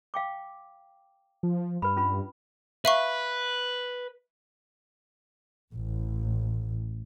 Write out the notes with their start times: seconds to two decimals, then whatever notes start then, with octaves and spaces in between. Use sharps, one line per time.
0.14 F5 G5 D6
1.43 F3
1.82 G2 B4 B5
1.97 C#4 F4 B5
2.85 B4 E5 F5 C#6
5.73 A1